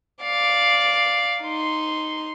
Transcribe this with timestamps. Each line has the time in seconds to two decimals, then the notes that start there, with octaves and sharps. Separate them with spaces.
0.23 D5 F5
1.43 D#4 C6